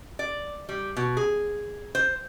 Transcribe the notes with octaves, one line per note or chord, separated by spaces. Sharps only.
D5
G3
B2
G#4
C5